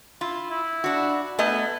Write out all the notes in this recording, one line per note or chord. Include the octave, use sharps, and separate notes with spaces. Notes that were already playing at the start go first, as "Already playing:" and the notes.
E4 F4
E4
D4 F#4
A3 B3 D#5 G#5